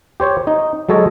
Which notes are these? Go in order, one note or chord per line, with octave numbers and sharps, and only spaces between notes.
G4 C5 C#5
D#4
F#3 G#3 A4 C#5 D#5